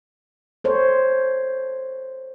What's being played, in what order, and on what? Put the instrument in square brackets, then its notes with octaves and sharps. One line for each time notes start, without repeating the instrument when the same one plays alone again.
[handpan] A4 C5 C#5